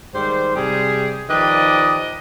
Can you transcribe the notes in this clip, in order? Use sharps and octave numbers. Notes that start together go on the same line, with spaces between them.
G#2 D#3 G3 C5
C3 G3 G#4
D#3 F3 G4 B4 D5 D#5